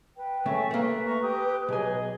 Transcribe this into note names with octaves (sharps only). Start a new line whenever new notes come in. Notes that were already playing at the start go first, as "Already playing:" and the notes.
B4 G5
C#3 A3 E5 G#5
A3 A#3 B4 E5
A#5 C#6
G4 D#6
B1 G#4 D#5 G#5